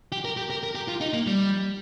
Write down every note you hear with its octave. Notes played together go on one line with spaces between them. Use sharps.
G4
A#4
G4
A#4
A#4
G4
F4
D#4
A#3
G3